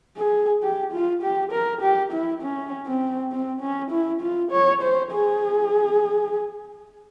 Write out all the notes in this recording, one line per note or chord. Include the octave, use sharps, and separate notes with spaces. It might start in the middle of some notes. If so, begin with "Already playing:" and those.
G#4
G4
F4
G4
A#4
G4
E4
C#4
C4
C4
C#4
E4
F4
C#5
C5
G#4